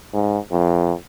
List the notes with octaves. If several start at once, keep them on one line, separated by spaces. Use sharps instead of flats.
G#2
F2